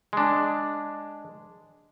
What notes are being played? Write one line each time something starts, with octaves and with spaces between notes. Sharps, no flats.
G#3 D4